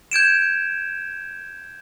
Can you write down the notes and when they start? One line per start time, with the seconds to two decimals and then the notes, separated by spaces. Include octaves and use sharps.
0.11 G6 G#6 D7 E7